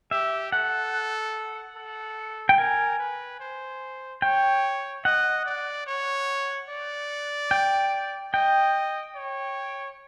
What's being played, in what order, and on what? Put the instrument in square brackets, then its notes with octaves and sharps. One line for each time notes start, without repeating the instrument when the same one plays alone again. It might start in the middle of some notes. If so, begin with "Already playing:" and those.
[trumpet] G4 [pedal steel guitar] E5
[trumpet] A4 [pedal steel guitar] F#5
[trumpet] A4
[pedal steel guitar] G5
[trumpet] A#4 [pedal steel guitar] G#5
[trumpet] B4
C5
[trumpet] C#5 [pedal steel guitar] G5
[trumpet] D#5 [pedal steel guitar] F#5
[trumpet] D5
C#5
D5
[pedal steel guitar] G5
[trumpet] D#5 [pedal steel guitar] G5
[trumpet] C#5